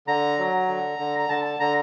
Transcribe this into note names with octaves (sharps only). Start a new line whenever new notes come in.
D3 A#5
F#3
D3
D3
A#5
D3 A5
A5
D3 A#5